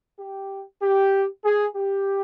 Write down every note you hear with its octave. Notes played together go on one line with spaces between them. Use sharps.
G4
G4
G#4
G4